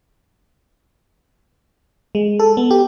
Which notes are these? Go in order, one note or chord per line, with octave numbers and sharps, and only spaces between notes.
G#3
A4
B3
G4